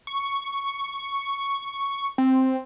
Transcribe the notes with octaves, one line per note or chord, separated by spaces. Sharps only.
C#6
C4